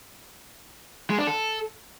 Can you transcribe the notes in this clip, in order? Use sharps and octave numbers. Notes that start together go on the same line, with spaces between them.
G#3
D4
A4